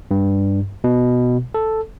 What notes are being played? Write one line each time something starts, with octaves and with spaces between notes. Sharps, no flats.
G2
B2
A4